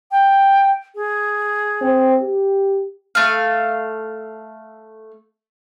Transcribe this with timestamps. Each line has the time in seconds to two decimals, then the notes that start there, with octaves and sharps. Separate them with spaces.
0.11 G5
0.95 G#4
1.81 C4
2.23 G4
3.15 A3 F5